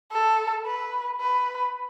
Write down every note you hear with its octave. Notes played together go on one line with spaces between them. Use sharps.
A4
B4
B4